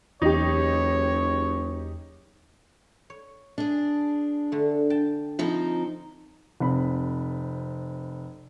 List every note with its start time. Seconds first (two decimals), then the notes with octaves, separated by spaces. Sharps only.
0.22 F#1 E2 D#4 G4 C#5
3.10 C#5
3.58 D4 G#4
4.52 D3 A3
4.90 G5 A5
5.39 F3 C4 D#4 B5
6.60 F1 C4 B5